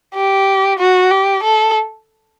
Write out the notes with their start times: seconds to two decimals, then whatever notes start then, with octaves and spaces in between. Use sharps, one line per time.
0.15 G4
0.79 F#4
1.11 G4
1.44 A4